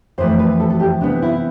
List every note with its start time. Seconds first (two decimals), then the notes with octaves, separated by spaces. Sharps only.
0.18 F2 E3 A3 C5
0.39 B4
0.60 A4
0.70 A4
0.80 G4
1.01 C3 E3 B3 D4
1.22 E4